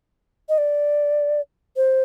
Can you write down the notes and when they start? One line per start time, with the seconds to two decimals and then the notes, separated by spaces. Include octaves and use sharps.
0.49 D#5
0.58 D5
1.77 C5